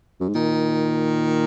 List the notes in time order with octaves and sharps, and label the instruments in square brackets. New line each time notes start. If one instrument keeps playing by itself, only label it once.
[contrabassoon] F#2
G#2
[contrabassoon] A#2 [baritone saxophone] D#3